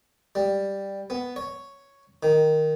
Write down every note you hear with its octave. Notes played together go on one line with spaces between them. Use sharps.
G3
B3
C#5
D#3